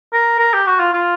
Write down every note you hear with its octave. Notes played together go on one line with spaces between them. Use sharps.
A#4
A#4
G4
F#4
F4
F4